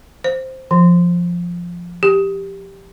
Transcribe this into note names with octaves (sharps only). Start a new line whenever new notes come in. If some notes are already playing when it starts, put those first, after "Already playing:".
C5
F3
G4